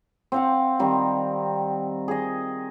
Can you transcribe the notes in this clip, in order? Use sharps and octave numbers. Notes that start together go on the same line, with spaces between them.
C4 F5 F#5
D#3 G3 C4
G#4 D#5